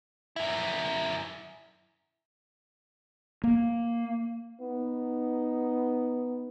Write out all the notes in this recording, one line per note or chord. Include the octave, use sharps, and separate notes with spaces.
F#2 E4
A#3
B3 D#4